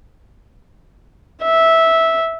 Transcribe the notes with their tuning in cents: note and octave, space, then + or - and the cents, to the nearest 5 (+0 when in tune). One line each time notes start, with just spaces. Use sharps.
E5 -10